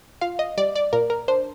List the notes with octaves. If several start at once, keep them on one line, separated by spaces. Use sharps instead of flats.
F4 F5
D#5
G3 D5
D5
A#2 A#4
A#4
D4 C5